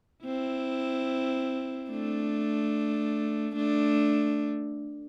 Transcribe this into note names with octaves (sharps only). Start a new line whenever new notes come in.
C4 E4
A3 D4
A3 D4